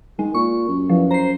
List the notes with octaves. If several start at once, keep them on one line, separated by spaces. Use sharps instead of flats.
D#3 G#3
A#2 C#6
F#2
E2 F3
C5 A#5 C7